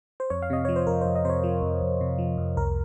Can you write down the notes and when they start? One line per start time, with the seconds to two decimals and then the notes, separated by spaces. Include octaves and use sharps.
0.20 C5
0.30 F2 C#5
0.42 F5
0.50 C3 D#5
0.65 F3 C#5
0.76 C5
0.87 F2 A#4
1.01 F2 C5
1.15 D#5
1.25 C3 C5
1.30 C#5
1.43 F3
1.62 F2
1.82 F2
2.01 C3
2.18 F3
2.38 F2
2.57 C2 A#4